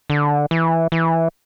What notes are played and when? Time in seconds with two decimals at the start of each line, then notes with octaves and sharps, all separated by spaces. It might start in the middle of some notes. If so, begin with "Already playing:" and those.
0.10 D3
0.51 E3
0.92 E3